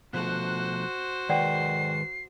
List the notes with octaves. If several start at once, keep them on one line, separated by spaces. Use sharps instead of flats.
B2 F3 A3 F#4 C5 F#6
D#3 G#3 B4 D5 F#5 G5 C7